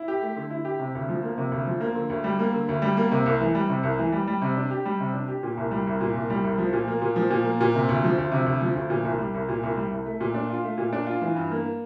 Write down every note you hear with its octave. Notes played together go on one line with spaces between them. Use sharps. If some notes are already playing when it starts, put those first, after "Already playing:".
Already playing: E4
G4
A3
D3
E4
G4
C3
D2
F3
A#3
C3
D2
F3
A#3
D3
D2
G3
A#3
D3
D2
G3
A#3
C3
C2
E3
G3
C3
C2
E3
G3
G3
C3
D4
G4
G3
C3
D4
G4
A#2
C2
G3
C2
A#2
C2
G3
C2
F3
A#2
A#3
A#2
F3
A#2
A#3
A#2
C3
D2
F3
D2
C3
D2
F3
D2
A#2
C2
G3
C2
A#2
C2
G3
C2
A3
A#2
D4
F4
A3
A#2
D4
F4
E3
G2
A#3